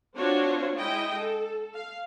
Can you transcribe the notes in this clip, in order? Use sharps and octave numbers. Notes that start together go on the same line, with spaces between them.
C4 D4 F4 F#4 C5 C#5
G#3 E4 D#5 G5
A4
F5